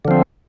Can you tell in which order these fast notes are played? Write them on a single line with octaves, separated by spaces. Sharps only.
D3 F3 C4